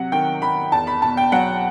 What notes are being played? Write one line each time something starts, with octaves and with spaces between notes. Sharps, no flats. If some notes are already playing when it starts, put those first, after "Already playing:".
Already playing: C3 F#3 F#5
D#3 G5
D#3 B5
E2 A5
B5
B2 A5
G5
F#3 F#5